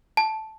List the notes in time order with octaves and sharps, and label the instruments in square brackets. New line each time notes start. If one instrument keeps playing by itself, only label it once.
[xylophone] A5